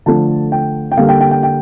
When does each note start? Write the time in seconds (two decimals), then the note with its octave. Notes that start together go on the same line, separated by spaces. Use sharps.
0.06 D3 F3 A3 A5
0.52 G5
0.92 G5
0.97 D3 G3 A#3 F5
1.09 G5
1.21 G5
1.31 G5
1.43 G5